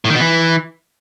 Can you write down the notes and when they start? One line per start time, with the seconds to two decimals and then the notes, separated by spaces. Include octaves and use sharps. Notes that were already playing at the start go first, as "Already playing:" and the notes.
0.05 A2
0.10 D#3
0.15 B2
0.20 E3